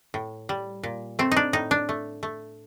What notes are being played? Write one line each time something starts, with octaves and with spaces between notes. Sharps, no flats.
A2
G3
A#2
A3 C4
D4 D#4
A2 D#4
D4
A3
A3